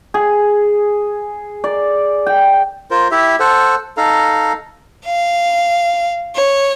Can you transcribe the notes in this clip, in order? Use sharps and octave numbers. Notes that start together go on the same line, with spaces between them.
G#4
D5
G5
F4 A#4 C5
E4 G4 E5
A4 C5 F#5
D#4 A4 F5 A#5
F5
C#5